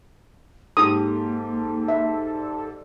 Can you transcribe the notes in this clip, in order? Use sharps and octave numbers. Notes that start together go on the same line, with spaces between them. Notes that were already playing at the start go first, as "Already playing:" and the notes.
G#2 A#3 G4 A4 D#6
E5
D5